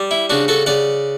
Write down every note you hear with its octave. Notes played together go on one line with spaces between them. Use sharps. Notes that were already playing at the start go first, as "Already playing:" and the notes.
Already playing: G3
E4
C#3 D4 F#4
F#4 A4
C#3 D5 F#5